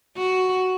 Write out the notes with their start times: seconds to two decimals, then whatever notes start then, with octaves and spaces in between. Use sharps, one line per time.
0.17 F#4